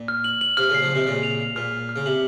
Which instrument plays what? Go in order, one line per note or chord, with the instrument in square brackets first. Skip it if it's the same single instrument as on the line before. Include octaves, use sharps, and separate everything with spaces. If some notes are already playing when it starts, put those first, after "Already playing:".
Already playing: [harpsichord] A#2
[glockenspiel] F6
F#7
F#7
[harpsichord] C3 [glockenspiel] F6
[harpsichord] A#2 C#3
[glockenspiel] C7
[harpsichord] C#3 F3
[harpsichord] C3 D#3 [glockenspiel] C7
[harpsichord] A#2 C#3 [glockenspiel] F6
[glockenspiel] F7
F7
[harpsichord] A#2 [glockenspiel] F6
[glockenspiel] F6
F6
[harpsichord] C#3
[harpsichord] C3 [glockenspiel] F#7